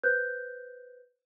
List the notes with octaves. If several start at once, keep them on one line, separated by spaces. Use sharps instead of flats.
B4 C5 F#6 G6